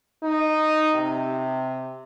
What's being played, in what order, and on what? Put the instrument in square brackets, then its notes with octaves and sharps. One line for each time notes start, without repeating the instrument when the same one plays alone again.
[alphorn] D#4
C3